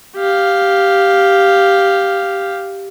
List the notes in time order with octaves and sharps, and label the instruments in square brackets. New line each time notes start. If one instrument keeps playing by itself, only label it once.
[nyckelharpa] G4 F5